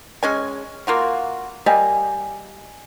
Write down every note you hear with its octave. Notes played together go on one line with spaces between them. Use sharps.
G#3 C#4 G#5
A#3 F4 F#4
G3 A#3 D#5 G#5